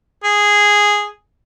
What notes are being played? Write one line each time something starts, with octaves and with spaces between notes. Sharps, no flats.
G#4